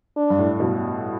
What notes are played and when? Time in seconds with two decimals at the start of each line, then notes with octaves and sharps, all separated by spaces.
0.17 D4
0.30 G2
0.39 A2
0.60 B2